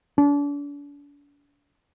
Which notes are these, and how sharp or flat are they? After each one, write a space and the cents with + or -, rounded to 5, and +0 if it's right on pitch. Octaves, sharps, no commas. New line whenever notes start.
D4 -40